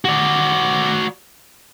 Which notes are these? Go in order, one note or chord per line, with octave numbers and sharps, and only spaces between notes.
F#4 D5